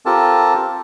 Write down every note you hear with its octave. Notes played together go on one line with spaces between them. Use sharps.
C4 F4 G4 A4 A#4 A5